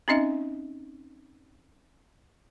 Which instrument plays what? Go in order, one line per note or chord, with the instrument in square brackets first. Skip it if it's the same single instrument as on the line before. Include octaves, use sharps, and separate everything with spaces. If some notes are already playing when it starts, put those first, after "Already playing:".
[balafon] C4 C#4 D#4 D#5 E5